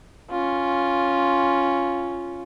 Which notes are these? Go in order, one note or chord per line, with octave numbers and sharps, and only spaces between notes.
C#4 F4